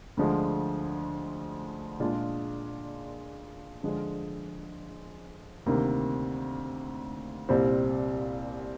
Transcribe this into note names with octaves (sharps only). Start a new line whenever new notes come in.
D2 D3 F3 G#3
A#2 G#3 D4 F4 G#4
D3 F3 G#3
D2 C3 D#3 A#3
C2 A#2 G3 C4